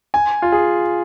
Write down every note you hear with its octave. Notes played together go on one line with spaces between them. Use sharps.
G#5
F4
G#4